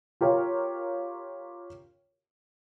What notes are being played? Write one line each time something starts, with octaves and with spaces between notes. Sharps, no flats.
F4 G4 A#4 C#5